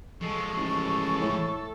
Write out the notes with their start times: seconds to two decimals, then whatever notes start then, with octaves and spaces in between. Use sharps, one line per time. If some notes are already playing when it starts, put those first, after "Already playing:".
0.22 F3 G#3 A4 C#6
0.56 A1 A4
1.21 A2